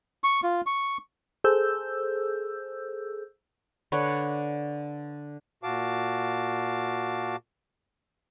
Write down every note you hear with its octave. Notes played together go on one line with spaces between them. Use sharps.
C#6
F4
C#6
G#4 A4 C5 E6 G6
D3 D4 B4 C#5
A#2 F#4 F5 A5 D6